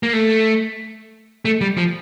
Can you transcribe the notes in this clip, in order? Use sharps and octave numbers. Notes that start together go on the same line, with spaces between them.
A#3
A3
A3
G3
F3